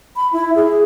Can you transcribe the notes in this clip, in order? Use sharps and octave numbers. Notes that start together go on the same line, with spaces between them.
B5
E4
G#4